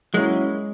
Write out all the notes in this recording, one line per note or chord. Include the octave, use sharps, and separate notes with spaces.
F#3 G#3 A#3 C#4 E4